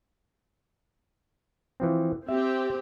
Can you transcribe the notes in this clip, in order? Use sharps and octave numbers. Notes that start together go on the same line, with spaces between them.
E3 F3 C4
C4 G4 E5